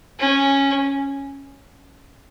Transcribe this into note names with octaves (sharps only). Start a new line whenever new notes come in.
C#4